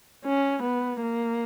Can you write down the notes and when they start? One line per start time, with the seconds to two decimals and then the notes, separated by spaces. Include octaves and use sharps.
0.25 C#4
0.63 B3
1.02 A#3